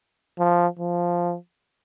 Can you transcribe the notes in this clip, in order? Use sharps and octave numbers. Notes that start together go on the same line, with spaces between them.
F3
F3